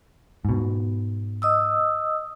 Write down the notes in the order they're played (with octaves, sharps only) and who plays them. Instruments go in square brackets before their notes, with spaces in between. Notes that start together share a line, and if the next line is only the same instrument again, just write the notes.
[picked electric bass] G#2 B2
[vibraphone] D#5 D#6 E6